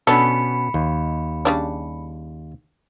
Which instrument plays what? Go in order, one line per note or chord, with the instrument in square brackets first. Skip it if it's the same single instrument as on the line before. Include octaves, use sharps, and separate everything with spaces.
[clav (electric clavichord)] B2 B3 C#4 [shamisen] D4 A4 [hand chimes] B5 C#7
[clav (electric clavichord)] D#2
[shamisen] C#3 G3 D4